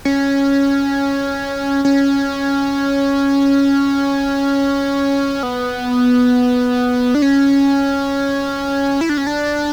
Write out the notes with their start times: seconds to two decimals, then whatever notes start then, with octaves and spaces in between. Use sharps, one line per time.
0.05 C#4
1.85 C#4
5.43 B3
7.15 D4
7.22 C#4
9.01 E4
9.09 D4
9.17 C#4
9.27 D4